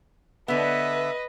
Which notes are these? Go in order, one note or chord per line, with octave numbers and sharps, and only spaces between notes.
D3 B3 B4 D#5 E5